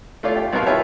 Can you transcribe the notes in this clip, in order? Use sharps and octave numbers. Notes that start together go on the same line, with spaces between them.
A3 F4 C#5 D5 F5
G4 G5
B1 B2 B3 A#4 F5 A#5
D#4 F4 G4 B4 C#5 E5